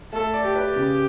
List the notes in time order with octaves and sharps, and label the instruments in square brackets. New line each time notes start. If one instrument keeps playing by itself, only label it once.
[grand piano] A3 [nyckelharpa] A4
[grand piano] D5
[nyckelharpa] G4
[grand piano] B4
C#3